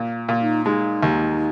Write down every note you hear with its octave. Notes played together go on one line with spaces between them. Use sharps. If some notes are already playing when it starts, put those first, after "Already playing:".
Already playing: A#2
A#2
D#4
G#3 D#4
D#2